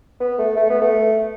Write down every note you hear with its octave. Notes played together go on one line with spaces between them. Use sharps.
B3
A3
A3
B3
A3